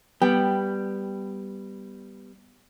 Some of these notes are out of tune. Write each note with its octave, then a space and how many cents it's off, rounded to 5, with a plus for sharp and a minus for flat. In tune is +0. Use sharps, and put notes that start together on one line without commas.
G3 +0 B3 +0 G5 +0